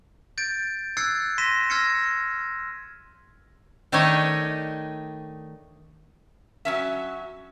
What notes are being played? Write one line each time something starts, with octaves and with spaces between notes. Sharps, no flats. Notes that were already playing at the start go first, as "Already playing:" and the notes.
G6 A6 D7
E6 F#6 G#6 A6 C7 C#7
C6 A#6 B6 D#7 E7
E6 F6 G#6 A#6 C7 C#7
D#3 A3 D4 D#4 C#5 D#5
F#3 C#4 E5